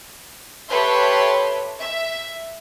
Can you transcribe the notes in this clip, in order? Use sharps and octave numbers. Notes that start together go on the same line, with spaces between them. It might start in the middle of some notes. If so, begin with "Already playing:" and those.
G4 A4 B4 C#5 E5 C6
E5